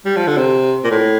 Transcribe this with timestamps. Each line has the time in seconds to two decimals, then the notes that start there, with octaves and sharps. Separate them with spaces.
0.05 G3
0.16 F3
0.27 D3
0.38 C3
0.84 A#2
0.91 A2